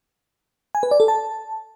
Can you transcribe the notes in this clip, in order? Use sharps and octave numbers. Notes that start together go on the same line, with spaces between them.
G#5
B4
D5
A4
A5